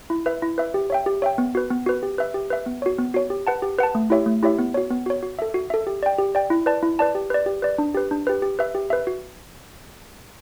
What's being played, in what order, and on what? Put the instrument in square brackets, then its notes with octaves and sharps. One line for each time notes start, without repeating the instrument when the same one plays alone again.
[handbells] E4
B4 E5
E4
B4 E5
G4
C#5 E5 G5
G4
C#5 E5 G5
B3
F#4 B4
B3
F#4 B4
G4
B4 E5
G4
B4 E5
B3
F#4 C#5
B3
F#4 C#5
G4
B4 F#5 A5
G4
B4 F#5 A5
A3
E4 G4 C#5 E5
A3
E4 G4 C#5 E5
B3
F#4 C#5
B3
F#4 C#5
F#4
A4 E5
F#4
A4 E5
G4
D5 G5
G4
D5 G5
E4
B4 D5 A5
E4
B4 D5 A5
G4
B4 D5
G4
B4 D5
D4
G4 B4
D4
G4 B4
G4
B4 E5
G4
B4 E5
F#4